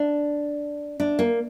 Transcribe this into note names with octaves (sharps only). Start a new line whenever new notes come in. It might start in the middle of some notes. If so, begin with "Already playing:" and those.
Already playing: D4
D4
A#3